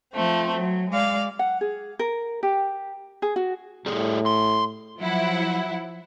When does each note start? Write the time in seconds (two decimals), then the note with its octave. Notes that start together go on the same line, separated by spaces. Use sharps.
0.14 F3 A3 C4
0.56 F#3
0.91 G#3 D5 F5
1.39 F#5
1.61 G#4
1.99 A#4
2.43 G4
3.22 G#4
3.36 F#4
3.86 A2 G3 G#4
4.26 C6
4.99 F3 F#3 E4 F#5